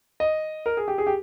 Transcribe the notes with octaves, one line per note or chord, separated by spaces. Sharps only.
D#5
A#4
G#4
G4
G#4
G4